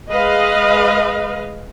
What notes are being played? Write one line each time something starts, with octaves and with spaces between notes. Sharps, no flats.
G#3 B4 D#5 F5